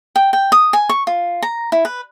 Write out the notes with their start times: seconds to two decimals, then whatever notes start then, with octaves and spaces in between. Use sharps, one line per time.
0.16 G5
0.33 G5
0.52 D#6
0.73 G#5
0.89 C#6
1.07 F4
1.42 A#5
1.72 E4
1.85 B4